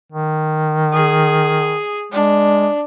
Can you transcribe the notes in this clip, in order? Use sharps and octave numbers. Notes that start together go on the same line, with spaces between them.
D#3
G#4
G#3 D4